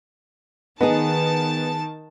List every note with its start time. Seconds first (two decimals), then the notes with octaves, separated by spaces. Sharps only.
0.81 D#3 B3 D#4 G#4 A5